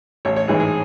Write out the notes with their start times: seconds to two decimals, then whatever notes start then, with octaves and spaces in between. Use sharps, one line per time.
0.25 A1 C#5
0.36 C#5
0.48 G#2 E3 G#3 G#4
0.60 G#4